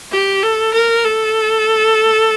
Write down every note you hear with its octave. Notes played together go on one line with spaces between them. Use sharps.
G4
A4
A#4
A4